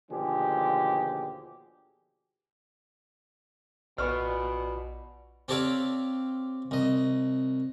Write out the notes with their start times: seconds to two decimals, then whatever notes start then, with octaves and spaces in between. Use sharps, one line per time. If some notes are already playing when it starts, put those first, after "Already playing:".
0.11 D#2 B2 D3 F3 G4 G#4
3.98 A#1 B2 B3 F4 D5 C#6 F6
5.48 C4 G4 A4 C#5 D5 F5
6.71 C2 D#5